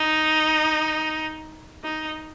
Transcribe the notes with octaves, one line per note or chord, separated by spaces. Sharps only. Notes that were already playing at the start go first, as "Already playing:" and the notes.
Already playing: D#4
D#4